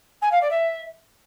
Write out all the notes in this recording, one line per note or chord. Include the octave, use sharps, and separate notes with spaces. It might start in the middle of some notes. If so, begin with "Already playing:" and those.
G#5
F5
D5
E5